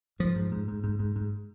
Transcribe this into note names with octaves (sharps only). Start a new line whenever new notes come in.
G#2 F3
G#2
G#2
G#2
G#2
G#2
G#2